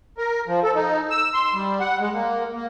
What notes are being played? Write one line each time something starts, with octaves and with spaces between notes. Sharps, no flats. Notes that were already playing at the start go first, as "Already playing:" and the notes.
A#4
F3
A4
D#4
E6
C6
G3
F#5
G#3
A#3
A#3